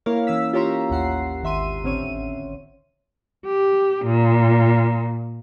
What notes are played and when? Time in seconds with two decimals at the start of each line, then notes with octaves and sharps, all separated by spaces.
0.06 A#3 E4 A#4 C#5 F5
0.27 E3 C#4 E6 B6
0.53 F4 G4 C#5 A#5 C6
0.89 A1 D#2 F#5 C7
1.42 G#1 D#3 E5 C6 D#7
1.83 A1 D3 C4 C#4 C#5 D#7
3.46 G4
4.05 A#2